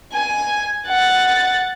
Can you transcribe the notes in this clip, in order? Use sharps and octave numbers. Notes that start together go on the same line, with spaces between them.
G#5
F#5 A6